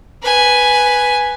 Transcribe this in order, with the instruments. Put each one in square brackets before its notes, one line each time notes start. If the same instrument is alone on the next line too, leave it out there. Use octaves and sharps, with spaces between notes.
[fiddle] B4 G#5